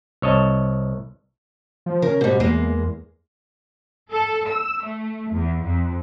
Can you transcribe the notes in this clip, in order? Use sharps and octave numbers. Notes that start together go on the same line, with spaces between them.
C2 C#5 D#5 A5
F3
C#3 A#4
G#2 B2 G3
E2 G#3 A#3
A4
E6
A3
E2
F2